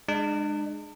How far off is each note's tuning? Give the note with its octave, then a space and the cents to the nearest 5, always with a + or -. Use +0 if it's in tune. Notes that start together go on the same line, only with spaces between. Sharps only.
G#3 +0 D4 +40